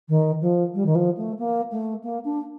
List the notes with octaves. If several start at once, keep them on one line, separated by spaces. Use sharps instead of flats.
D#3
F3
G3
D#3
F3
A3
A#3
A3
A#3
D4